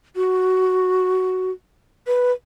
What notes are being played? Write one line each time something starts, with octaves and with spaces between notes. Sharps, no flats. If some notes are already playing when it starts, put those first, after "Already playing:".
F#4
B4